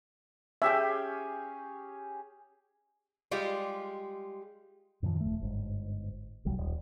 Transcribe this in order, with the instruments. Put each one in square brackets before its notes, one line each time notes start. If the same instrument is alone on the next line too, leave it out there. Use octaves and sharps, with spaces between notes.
[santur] C#4 G4 G#4 [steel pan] E5 G5
[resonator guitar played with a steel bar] G3 G#3 F4 G4
[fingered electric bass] F#2 A#2 D#3 F3
D#1 A3
G1 G#2
D#1 B1 F#3 G3
D#1